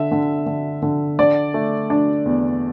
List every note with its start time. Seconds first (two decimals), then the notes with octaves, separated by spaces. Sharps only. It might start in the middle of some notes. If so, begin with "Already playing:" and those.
Already playing: D3 E5
0.12 D3
0.46 D3
0.82 D3
1.19 D3 D5
1.54 A3
1.90 D4
2.26 E2